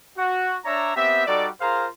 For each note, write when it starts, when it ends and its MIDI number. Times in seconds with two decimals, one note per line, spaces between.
0.17 0.57 66
0.65 0.94 62
0.65 0.94 73
0.65 0.94 74
0.65 0.94 76
0.65 0.94 82
0.96 1.26 59
0.96 1.26 60
0.96 1.26 67
0.96 1.26 76
1.26 1.48 55
1.26 1.48 63
1.26 1.48 66
1.26 1.48 69
1.26 1.48 74
1.61 1.87 65
1.61 1.87 68
1.61 1.87 70
1.61 1.87 72
1.61 1.87 77
1.61 1.87 82